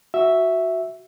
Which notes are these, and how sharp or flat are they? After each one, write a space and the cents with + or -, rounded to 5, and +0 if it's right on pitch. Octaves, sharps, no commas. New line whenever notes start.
F#4 +0 E5 +0